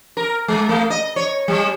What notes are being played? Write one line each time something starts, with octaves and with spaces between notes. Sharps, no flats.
A#4
G#3
A3
D#5
C#5
G3